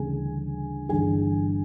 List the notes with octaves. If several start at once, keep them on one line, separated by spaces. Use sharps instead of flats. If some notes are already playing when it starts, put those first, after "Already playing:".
Already playing: D2 C#3 E3 G3 G#4 G#5
G1 G2 E3 G#4 G#5